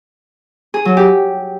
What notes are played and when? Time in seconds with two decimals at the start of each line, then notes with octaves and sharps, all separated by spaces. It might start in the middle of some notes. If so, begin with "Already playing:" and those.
0.74 G#4
0.85 F#3
0.97 G4